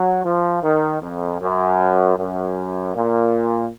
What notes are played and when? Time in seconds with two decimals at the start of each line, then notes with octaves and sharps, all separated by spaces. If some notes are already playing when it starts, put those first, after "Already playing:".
Already playing: F#3
0.24 F3
0.63 D#3
1.02 F2
1.40 F#2
2.17 F#2
2.95 A#2